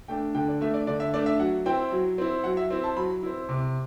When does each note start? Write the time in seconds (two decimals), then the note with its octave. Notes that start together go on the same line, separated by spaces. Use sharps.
0.08 A3 D4 G5
0.34 D3 G5
0.48 D5
0.61 A3 D4 E5
0.74 D5
0.87 D3 D5
1.00 E5
1.14 A3 D4 D5
1.26 E5
1.40 F#3 F#5
1.66 C4 E4 G5
1.92 F#3
2.18 C4 E4
2.44 F#3 F#5
2.57 E5
2.71 C4 E4
2.84 A5
2.97 F#3 B5
3.23 C4 E4
3.49 C3 D6